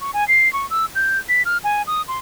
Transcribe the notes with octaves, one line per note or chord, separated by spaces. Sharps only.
C#6
G#5
C7
C#6
E6
G6
B6
F6
G#5
D#6
C6